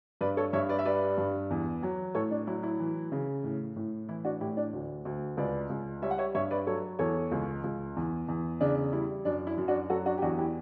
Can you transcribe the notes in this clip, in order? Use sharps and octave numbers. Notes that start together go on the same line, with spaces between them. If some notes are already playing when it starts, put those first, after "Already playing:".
G2 B4 D5
A4 C#5
G2 C#5 E5
B4 D5
E5
G3 B4 D5
G2
E2
F#3
A2 A4 C#5
D4
F#3 E4
E4
E3
C#3
A2
A2
E3 E4
D4 F#4
A2 E4 G4
D4
D2
D2
C#2 B4 D5
C#2
G3 C#5 E5
F#5
C#5 E5
G2 C#5 E5
B4 D5
F#3 A4 C#5
E2 A4 C#5
C#2
C#2
E2
E2
C#3 D4
G3 E4
F#2 D4
E4
F#2
D4 F#4
F#3 F#4 A4
D4 F#4
G4
E2 D4 F#4
E4 G4